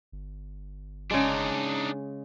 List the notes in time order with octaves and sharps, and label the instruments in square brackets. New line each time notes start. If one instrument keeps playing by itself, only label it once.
[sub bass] G1
[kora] C#3 G#3 [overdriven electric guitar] D4 D#4